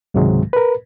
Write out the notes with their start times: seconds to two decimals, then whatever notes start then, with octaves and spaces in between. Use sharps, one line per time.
0.14 C#2 G#2 C3 D#3 F#3 G#3
0.53 A#4 B4